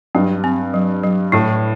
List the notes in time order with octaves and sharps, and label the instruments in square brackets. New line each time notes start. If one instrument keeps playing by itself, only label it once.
[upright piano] G2 [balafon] F#3
[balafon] C4
F#3
F#3
[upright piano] A2 [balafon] E4